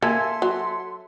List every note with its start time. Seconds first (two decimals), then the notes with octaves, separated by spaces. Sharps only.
0.03 A#3 A4 E5 G#5 C6
0.42 F#3